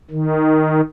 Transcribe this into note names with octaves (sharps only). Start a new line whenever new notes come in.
D#3